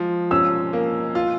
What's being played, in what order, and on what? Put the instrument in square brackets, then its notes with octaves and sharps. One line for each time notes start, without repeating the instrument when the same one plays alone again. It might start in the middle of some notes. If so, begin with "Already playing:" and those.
Already playing: [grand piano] F3 G#3
[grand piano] C#4 [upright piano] E6
[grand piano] A#3
F4